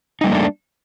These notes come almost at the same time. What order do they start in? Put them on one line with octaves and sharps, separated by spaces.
D#4 G3 A#3 A3 D4